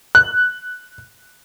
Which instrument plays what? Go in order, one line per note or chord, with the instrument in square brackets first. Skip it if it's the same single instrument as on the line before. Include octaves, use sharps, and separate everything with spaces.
[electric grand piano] F#6